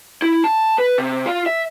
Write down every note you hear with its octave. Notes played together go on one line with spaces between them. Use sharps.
E4
A5
B4
C3
F4
E5